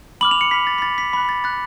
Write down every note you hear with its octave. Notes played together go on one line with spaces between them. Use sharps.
B5 D6 F6 F#7
F7
C#7
B5 F6 B6
A6
B6
B5 F6 A6
B6
B5 F#6 B6
A6
B5 F#6 A6